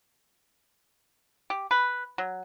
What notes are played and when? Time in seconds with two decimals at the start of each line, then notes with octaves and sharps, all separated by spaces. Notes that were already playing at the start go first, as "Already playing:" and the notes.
1.50 G4
1.71 B4
2.18 F#3